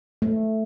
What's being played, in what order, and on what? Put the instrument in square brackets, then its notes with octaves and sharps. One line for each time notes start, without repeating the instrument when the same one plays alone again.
[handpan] A3